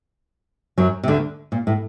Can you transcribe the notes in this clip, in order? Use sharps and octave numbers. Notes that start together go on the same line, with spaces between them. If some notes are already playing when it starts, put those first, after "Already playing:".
F#2 F#3
C3
D2 D3
A#2
A2